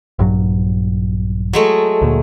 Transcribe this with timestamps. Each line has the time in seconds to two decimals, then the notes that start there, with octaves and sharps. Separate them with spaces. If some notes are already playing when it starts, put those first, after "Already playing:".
0.19 A#1 G2 F#3
1.53 F#3 G#3 A3
2.02 D2 A#2